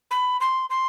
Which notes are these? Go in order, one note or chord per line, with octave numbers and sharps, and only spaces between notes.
B5
C6
C6